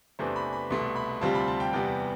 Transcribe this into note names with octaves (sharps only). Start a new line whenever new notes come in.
E2 C3 E3 A3 D4 C5
B5
B5
C2 B2 A3 C6
B5
D2 C3 G3 C4 F4 A5
B5
A5
G5
E2 C3 G3 B3 G5